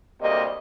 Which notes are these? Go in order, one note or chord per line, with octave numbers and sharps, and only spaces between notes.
D2 C3 G3 A#3 D#5